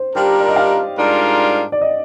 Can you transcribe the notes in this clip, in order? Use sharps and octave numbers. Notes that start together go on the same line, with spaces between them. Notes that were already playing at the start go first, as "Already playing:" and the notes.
Already playing: C5
G3 D4 F4 G4 A#4
D5
D#5
F5
G#2 G3 D4 F4 A#4
D5
D#5